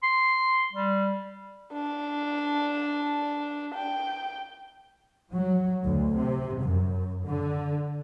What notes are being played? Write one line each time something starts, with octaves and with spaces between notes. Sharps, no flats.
C6
G3
D4
G5
F#3
D2
C3
F#2
D3